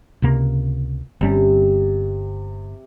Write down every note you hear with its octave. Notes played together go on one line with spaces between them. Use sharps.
C#2 C3 A#3
G1 C3 G3 C#4